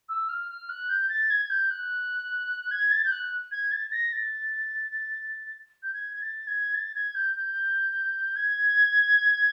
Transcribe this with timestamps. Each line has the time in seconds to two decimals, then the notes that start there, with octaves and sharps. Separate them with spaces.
0.08 E6
0.28 F6
0.49 F6
0.69 F#6
0.89 G6
1.08 A6
1.30 G#6
1.50 G6
1.70 F#6
2.71 G#6
2.91 A6
3.04 G6
3.11 F#6
3.51 G#6
3.71 A6
3.92 A#6
4.12 A6
5.82 G6
5.93 G#6
6.14 G#6
6.21 A6
6.47 G#6
6.74 A6
6.95 G#6
7.14 G6
7.35 G6
8.35 G#6